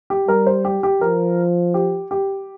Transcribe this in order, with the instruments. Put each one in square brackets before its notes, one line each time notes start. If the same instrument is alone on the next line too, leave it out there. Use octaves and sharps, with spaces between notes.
[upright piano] G4
[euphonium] G3 [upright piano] A#4
[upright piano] C5
G4
G4
[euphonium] F3 [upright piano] A#4
[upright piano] G4
G4